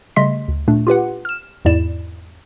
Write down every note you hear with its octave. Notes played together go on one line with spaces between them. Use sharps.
C#3 G3 A3 D#5 C6 B6
D2
A#2 A3 D4
F4 G4 B4 F#5
F6 E7
E2 G#2 E4 D5 E7